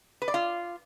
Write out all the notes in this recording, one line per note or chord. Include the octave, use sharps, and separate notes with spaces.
B4
D5
F4